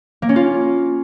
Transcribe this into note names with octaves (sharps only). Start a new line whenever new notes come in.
A#3
C#4
F4